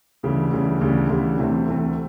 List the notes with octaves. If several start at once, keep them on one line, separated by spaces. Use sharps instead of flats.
D2 C#3 E3 G3
D2 C#3 E3 G3
D2 C#3 E3 G3
D2 C#3 E3 G3
D2 C3 E3 A3 C4
D2 C3 E3 A3 C4